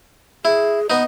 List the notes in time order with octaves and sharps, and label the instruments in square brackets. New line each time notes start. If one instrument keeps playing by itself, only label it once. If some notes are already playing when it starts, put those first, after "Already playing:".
[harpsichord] E4 [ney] G#4
[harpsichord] B3 D#4 [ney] D#5